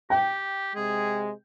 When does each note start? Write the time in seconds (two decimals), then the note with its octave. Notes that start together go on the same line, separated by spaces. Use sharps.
0.10 G4 G5
0.75 C3 G#3 G#4